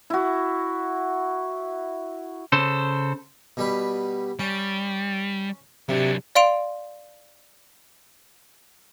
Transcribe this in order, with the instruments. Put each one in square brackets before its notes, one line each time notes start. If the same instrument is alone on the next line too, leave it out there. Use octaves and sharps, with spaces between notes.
[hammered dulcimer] E4 F#4
[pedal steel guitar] C#3 A4 C5
[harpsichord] B2 G3 B4
[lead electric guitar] G3 [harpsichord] C#4
[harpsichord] C3 [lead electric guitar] F#3 D4
[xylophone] D5 F5 C6 D7 F7